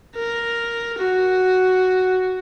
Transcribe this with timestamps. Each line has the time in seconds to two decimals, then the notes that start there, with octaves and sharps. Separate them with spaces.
0.16 A#4
0.99 F#4